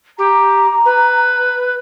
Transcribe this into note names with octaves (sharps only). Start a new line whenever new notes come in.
G4 A#5
B4